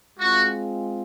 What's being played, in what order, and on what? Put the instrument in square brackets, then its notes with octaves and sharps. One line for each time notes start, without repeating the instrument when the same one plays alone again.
[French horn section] G#3 C4 F4 [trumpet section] F#4